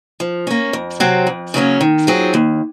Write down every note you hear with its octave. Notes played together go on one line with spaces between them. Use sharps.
F3
A#3 C#4
F2
C3 F#3 C4
F2
C#3 F#3 A#3 C#4
D#3
F#3 C4 F4 G#4
D#2